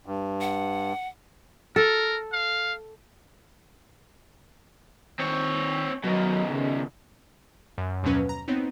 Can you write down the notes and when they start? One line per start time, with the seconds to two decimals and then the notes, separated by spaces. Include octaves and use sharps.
0.06 G2
0.41 F#5
1.76 A4 A#4
2.32 F5
5.19 D#3 C4 C#5
6.04 B2 D#3 F#3
6.49 C#3
7.78 F#2
8.03 D#2 B2 F3 F#3 C#4 B4
8.29 A#5
8.48 B3 C4 D#4 C#5